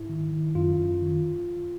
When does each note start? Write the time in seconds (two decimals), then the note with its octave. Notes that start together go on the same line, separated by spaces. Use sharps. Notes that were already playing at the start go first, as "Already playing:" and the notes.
Already playing: G#2 E4
0.09 D#3
0.32 D#3
0.55 F#2 F4
0.78 F#2
1.02 D#3